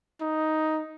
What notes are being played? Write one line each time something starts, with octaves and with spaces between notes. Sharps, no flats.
D#4